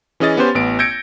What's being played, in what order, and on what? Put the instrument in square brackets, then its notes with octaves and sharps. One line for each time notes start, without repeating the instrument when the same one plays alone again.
[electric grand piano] E3 C#4 G#4 D#5 A6
B3 C#4 G4 B4 C5
A1 B3 D7
E6 G6 G#6 A#6 C#7 D7